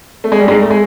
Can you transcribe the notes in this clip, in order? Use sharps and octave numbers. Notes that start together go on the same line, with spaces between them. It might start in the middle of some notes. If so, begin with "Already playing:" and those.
A3
G#3
G3
G#2 G#3
A3
G#3